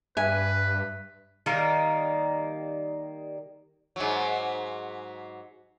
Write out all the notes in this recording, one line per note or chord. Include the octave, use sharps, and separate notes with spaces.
G2 B4 E5 G#5
D#3 G3 A#3 D#4
G#2 F#3